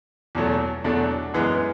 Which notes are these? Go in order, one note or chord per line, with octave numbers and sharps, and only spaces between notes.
E2 B2 F#3 A3
E2 B2 F#3 A3 D4
F#2 E3 G#3 B3